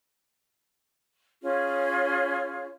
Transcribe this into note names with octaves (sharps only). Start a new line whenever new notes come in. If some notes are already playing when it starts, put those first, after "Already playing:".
C#4 F4 G#4